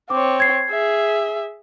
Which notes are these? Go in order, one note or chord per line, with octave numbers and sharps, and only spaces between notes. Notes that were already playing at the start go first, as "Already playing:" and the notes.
C4 C#5 D6
G#6 C7
G#4 E5